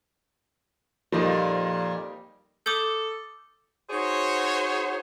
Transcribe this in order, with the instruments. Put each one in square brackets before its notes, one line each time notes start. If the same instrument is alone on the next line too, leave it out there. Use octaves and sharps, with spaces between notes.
[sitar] F2 A#2 [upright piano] G3 A#3 D#4
[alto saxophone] A4 [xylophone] D6 D#6 G6
[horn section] D#4 F#4 G#4 C5 C#5